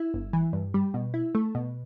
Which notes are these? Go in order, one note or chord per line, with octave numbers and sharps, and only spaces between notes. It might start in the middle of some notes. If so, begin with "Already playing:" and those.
Already playing: E4
G1
E3
G2
G3
B2
E4
A3
B2